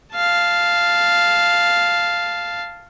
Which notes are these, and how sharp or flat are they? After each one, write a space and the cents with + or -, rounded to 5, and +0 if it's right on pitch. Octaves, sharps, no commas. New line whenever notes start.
F5 -5 A5 +0